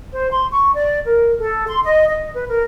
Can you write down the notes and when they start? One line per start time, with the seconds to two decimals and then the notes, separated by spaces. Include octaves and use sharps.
0.12 C5
0.31 C6
0.50 C#6
0.74 D5
1.06 A#4
1.39 A4
1.67 C6
1.84 D#5
2.09 D#5
2.34 B4
2.47 A#4